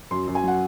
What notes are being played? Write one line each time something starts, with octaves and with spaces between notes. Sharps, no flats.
F#2 C6
F#2
G#5
F#3 F#5